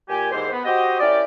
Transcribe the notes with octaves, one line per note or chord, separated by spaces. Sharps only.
A#2 G4 G#5
D#2 G#2 E3 G4 C5
B3
F#4 G4 C5 D#5
C#4 E4 G4 A#4 D5